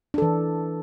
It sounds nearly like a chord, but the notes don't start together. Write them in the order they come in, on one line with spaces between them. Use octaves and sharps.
D4 A4 E3